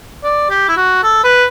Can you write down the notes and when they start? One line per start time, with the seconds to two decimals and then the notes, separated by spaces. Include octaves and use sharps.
0.23 D5
0.50 G4
0.69 E4
0.77 F#4
1.03 A4
1.24 B4